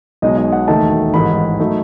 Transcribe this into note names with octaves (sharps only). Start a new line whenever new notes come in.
B1 B2 G#3 D#4 D#5
D#5
F#5
E1 D#2 D#3 A3 D#4 A5
A1 G#2 D#3 B5
F#3 A3 D#4